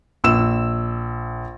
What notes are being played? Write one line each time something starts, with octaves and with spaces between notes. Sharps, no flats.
A#1 E6 E7